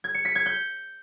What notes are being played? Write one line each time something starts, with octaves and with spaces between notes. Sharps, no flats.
G#6
C#7
B6
G#6
G6